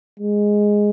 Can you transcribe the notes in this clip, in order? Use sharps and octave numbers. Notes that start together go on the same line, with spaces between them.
G#3